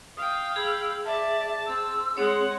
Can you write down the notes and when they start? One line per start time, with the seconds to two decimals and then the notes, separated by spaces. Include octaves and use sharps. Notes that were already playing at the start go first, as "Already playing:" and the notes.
0.17 F5 G5 D#6
0.56 G#4 B5 E6
1.05 D5 E5 A5
1.66 C4 E6
2.17 G#3 C4 G#4 C#5 F#5